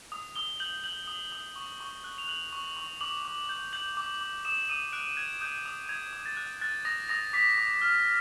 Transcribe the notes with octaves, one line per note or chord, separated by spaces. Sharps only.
D#6
D#6 G7
G6 F#7
G6 F#7
D#6
D#6
C#6
C#6
F#6
F7
F#6 F#7
C#6
C#6
D6 F#7
D6
G6
G6 F#7
D6
D6
D#6 E7
D#6 D#7
F#6 D7
F#6 G#6
D#6 G6
D#6
D#6 G#6
D#6
A6
F#6
F#6 A6
D#6 A#6
D#6 A#6
D6 B6
D6
F6